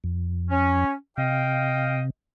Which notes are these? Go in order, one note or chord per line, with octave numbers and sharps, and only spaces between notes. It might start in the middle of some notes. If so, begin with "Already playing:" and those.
F2
C#4
C3 D#5 F5 G5